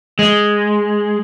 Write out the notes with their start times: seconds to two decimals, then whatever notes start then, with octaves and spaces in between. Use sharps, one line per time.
0.19 G#3